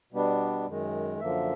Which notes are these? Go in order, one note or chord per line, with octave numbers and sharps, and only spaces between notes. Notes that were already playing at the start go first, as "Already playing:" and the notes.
B2 G3 B3 D4
F#2 D#3 G#3
F#2 D3 F3 A#3 E5